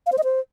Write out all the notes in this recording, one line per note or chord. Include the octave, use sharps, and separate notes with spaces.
F5
C5
D#5
C5